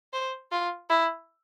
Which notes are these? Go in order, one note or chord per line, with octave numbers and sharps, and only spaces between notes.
C5
F4
E4